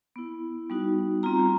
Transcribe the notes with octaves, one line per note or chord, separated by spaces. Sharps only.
B3 E4
G3 B3 D#4 F#4
G3 C4 F4 A#5